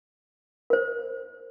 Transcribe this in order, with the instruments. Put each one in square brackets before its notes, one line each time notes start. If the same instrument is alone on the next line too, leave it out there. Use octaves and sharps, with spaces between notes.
[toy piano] A#4 C5